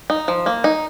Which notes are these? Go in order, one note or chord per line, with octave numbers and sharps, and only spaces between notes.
D#4
F3
A#3
D#4